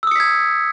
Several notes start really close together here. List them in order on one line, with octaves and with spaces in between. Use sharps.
E6 D#6 C#7 B6 G#6